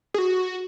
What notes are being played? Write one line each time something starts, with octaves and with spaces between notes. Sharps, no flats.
G#4
F#4